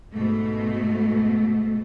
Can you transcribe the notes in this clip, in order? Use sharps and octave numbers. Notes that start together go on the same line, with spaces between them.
G#2 B2 A3